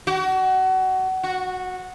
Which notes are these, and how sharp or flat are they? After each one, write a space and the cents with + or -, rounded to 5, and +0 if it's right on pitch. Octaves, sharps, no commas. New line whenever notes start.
F#4 +25
F#4 -10